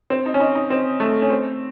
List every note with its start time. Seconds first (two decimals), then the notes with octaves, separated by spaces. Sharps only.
0.10 C4
0.26 D#4
0.34 C#4
0.40 D#4
0.55 D#4
0.70 C4
1.00 A3
1.22 C#4
1.30 C4